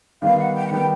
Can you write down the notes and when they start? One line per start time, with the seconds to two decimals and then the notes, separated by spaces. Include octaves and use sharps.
0.22 D#3 G3 B3 F5
0.38 F#5
0.55 G5
0.67 F#5
0.71 D#3 G3 B3 G5